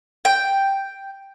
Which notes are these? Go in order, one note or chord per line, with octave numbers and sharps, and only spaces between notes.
G5